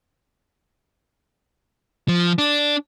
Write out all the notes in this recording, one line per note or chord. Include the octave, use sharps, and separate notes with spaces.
F3
D4